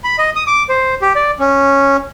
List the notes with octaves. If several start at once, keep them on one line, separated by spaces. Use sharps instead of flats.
B5
D#5
D#6
D6
C5
G4
D5
C#4